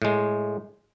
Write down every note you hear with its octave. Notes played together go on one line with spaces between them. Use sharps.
A2 G#3